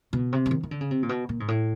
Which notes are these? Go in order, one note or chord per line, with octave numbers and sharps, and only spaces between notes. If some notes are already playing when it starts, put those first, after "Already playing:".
B2
C3
E3
D#3
D#3
D3
C#3
C3
A#2
B2
A#2
G#2
A2